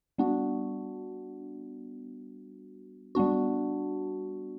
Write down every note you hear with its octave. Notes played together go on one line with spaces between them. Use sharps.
G3 B3 D4 F#4
G3 B3 D4 F#4